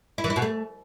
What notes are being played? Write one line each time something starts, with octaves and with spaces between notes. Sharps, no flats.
E4
E3
E4
B2
A3